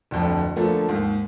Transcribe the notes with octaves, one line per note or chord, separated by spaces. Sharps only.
D1 F2 D3
D3 F3 A3 A#3
D#2 G#2